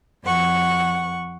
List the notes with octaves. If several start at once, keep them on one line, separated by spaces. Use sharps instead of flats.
F2 F#5 C#6